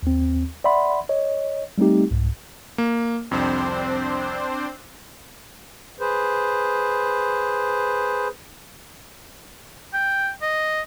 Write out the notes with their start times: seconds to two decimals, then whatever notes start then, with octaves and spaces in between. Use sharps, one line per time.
0.03 D#2 C4
0.64 D5 E5 F#5 B5 C6
1.09 C#5 D#5
1.78 G3 A3 C4 D#4 G4
2.11 C2 G#2
2.78 A#3
3.31 C2 F2 C4 D4 C5
6.00 G#4 B4 C5
9.94 G5
10.42 D#5